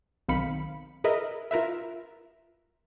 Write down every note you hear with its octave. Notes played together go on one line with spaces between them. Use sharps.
B1 D#3 C4 F5 B5 C#7
G#4 A#4 B4 D#5 E5
F4 A#4 B4 E5